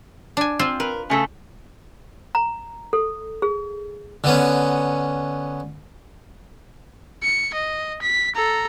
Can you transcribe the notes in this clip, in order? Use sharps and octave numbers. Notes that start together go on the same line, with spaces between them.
D4 G#5
C4 F4 C5
A#4 B4
C#3 A3 A4
A#5
A4
G#4
D3 B3 C#4
C#7
D#5
B6
A4 A#5